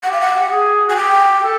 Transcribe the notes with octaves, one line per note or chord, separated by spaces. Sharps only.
G4 F#5
F5
F#5
G4
G#4
F#4 G#5
G4 G5
A4